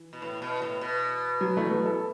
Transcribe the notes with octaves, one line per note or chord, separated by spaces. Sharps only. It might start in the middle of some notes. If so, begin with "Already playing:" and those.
Already playing: E3
B2
A2
B2
A2
B2
F#3
E3 A3
F#3 B3
E4 A4